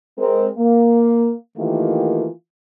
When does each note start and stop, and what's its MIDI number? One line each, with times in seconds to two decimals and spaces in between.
0.19 0.49 56
0.19 0.49 60
0.19 0.49 70
0.57 1.32 58
1.58 2.28 51
1.58 2.28 52
1.58 2.28 57
1.58 2.28 58
1.58 2.28 65
1.58 2.28 67